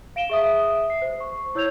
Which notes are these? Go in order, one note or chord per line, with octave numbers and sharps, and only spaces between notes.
F5 D7 E7 G7
G#4 E5 D#6
C7
C5
C#6
E4 C#5 E6 G6 G#6 F7